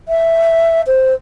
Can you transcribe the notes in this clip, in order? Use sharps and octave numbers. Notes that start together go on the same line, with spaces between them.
E5
C5